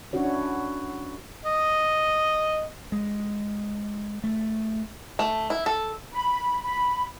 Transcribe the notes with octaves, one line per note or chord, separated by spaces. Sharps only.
C#4 D4 E4 F#4 C#5
D#5
G#3
A3
A3
E4
A4
B5
B5